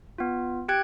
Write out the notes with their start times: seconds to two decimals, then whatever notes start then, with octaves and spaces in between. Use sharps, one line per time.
0.18 B3 F4
0.69 G4 G5 F#6 G#6 D7